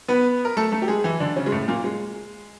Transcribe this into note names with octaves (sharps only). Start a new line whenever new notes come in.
B3 B4
A#4
A3 A4
A3 A4
G4
G#3 G#4
E3 E4
D3 D4
C#3 C#4
G#3
A2 A3
A#2 A#3
G#3